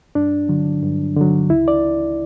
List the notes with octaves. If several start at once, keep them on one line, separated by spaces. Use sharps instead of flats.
G2 D4
D3 F#3
G2
D3 F#3
C#2 E4
D5